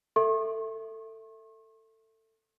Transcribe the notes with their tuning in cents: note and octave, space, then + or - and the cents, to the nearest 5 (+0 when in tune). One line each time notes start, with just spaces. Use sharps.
A4 +20 E5 +0 C#6 -45